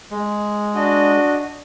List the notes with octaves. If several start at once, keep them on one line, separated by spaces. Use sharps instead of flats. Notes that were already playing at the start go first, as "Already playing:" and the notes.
G#3
D4 F#4 D#5